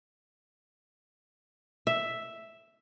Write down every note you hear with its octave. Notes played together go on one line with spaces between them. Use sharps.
E5